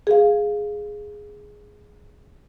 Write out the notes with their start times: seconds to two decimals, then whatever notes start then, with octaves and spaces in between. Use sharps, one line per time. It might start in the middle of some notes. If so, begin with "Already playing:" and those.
0.07 G#4 F5